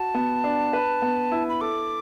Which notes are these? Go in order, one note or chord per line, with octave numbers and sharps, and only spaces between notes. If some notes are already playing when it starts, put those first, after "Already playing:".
Already playing: F#4 A5
B3
D4
B4
B3
E4
B5
A4 D6